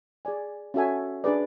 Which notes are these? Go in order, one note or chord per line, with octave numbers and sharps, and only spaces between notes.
G#4 D5 G#5
C#4 F#4 A4 E5 G#5
D4 G#4 B4 D5